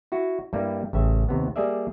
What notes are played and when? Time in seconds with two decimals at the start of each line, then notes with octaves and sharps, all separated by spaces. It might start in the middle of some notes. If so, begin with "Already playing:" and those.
0.12 E4 F#4
0.53 G2 G3 A#3 E4
0.93 A1 C#3 E5
1.29 D#2 C3 B3
1.56 G3 A#3 G#4 D5 E5